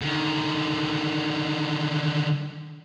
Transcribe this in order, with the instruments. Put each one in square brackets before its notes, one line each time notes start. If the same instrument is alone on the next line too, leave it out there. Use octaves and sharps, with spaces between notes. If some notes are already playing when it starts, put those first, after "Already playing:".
[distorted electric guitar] D3 D#3